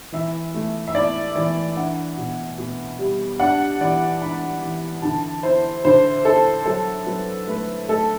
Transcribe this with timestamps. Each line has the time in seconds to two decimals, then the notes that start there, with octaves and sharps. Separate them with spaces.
0.12 E3 E5
0.54 A3
0.87 E5
0.94 E4 D5
1.35 E3 D5
1.76 D4 F#5
2.17 B2
2.58 B2
2.99 G3
3.39 D4 F#5
3.81 E3 D5
4.21 D4 B5
4.62 E3
5.02 D3 A5
5.43 E4 C5
5.85 D3 C5
6.25 E4 A4
6.66 F#3 A4
7.06 F#3 B4
7.47 A3 B4
7.88 A3 A4